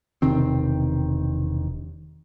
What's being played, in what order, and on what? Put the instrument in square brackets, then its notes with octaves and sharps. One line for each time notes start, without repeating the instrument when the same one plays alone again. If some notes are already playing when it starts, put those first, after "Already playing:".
[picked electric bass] E1 C3 D#3 C4